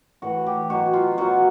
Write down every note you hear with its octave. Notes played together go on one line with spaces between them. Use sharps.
A2 E3 F#4
G4
B2 F#3 F#4
F4
B2 F#3 F#4